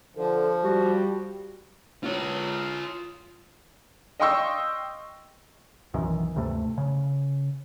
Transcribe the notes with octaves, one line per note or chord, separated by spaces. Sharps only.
D3 F3 A4
G3 F#4
F4 C#5
D#5 F5 G5 C6 C#6 E6
B1 F#2 D#3 E3
D2 G2 C3 A3
C#3